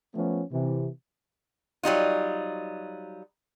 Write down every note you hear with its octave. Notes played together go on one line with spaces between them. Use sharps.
F3 A3 B3 C#4
C3 E3
F#3 G3 D#4 F4